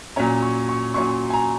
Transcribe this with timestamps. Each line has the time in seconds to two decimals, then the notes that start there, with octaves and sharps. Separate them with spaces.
0.16 A#2 F#3 C#4 A#5
0.42 C#6
0.69 C#6
0.94 A#2 F#3 C#4 C#6
1.30 G#5
1.34 A#5